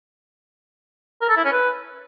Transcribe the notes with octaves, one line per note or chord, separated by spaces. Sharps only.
A#4
A4
E4
C#4
B4